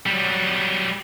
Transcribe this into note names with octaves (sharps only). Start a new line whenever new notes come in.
F#3 G3